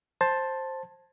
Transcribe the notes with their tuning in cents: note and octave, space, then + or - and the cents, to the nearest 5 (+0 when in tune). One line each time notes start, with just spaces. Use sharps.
C5 +10 A5 +0